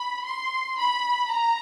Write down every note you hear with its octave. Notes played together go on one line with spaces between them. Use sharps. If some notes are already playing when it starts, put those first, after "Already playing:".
Already playing: B5
C6
B5
A#5